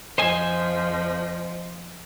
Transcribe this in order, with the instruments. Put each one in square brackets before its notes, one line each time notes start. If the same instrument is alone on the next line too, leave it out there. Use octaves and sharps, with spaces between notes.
[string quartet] F2 F3 [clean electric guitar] C5 D#5 G#5